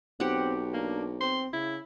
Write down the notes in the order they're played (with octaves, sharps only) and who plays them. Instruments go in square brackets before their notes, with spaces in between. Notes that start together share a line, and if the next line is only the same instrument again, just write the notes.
[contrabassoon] B1 [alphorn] C4 [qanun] G4 F#5
[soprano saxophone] A#3 [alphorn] D4
[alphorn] C4 [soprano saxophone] C6
[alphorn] C#3 [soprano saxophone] E4